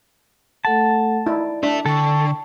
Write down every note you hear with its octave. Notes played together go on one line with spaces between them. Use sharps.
A3 A4 F#5 A5
D#4 E4 D5
D4 A4 E5
D3 A4 G5 C#6
A5